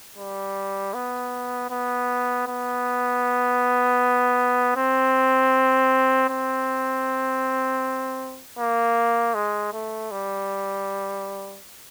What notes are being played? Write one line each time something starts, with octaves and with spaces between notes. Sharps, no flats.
G3
B3
B3
B3
C4
C4
A#3
G#3
A3
G3